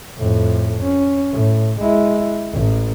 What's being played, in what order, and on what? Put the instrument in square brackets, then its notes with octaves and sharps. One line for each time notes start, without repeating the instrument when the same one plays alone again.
[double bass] F2 A2
C#4
A2
G#3 E4
A1